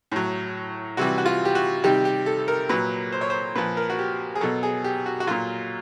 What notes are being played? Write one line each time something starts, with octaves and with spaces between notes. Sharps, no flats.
A2 F#3
C3 E3 G3 F#4
F#4
F4
G4
F#4
C3 D#3 G3 G4
G4
A4
A#4
A#2 F#3 B4
C5
C#5
C5
A#2 F3 B4
A#4
F#4
G4
G#4
B2 F#3 A4
G#4
G4
F#4
F#4
A#2 F#3 F4